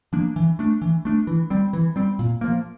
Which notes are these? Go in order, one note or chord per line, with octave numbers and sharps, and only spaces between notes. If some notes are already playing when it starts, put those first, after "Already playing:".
F3 A#3 D4
E3
A3 D4
E3
A3 D4
E3
G3 C4
E3
G3 C4
A#2
F3 A#3